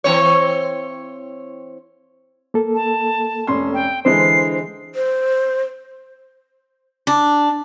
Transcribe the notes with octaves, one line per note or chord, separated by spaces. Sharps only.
E3 C4 C#5
A#3 A4
A5
F1 C#4 C6
G5
D3 E3 G#3 C5 C7
C5
D4